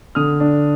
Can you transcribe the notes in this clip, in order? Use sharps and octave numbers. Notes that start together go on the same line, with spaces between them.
D3 D#6 F6
D4